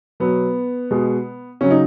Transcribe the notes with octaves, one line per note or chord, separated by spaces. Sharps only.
B2 F#3 B3
B2 G#3
C#3 F#3 C#4
D#4